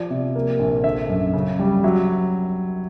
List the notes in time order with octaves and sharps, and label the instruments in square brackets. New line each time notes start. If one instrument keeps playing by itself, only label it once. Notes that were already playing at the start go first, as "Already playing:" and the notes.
Already playing: [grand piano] F3 D5
C3
A#3
A#1
D3 E5
F#2
C#3
G3
F#3 E5